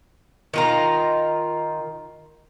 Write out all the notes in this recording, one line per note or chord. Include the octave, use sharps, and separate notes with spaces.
D#3 F4 A#5